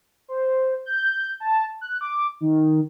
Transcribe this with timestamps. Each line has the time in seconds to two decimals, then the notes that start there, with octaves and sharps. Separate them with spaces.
0.28 C5
0.86 G6
1.40 A5
1.81 F#6
2.01 D6
2.41 D#3